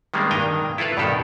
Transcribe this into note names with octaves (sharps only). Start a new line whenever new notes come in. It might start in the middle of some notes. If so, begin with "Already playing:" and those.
D#3 G3 G#3 A#3 B3 D4
G2 D#3 G5 G#5 A#5
E4 F4 A4 B4 F5
G2 B2 D#3 G4 A4